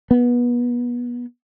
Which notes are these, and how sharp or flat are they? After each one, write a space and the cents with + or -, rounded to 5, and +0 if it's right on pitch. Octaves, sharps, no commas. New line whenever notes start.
B3 -25